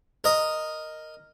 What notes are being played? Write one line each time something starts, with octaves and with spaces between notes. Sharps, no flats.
A#4 D#5